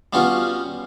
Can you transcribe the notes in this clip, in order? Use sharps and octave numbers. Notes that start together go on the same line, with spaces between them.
G3 B3 C#4 F4 F#4